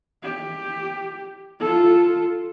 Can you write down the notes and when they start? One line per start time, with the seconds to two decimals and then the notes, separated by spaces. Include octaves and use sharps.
0.24 G4
1.60 F4 A4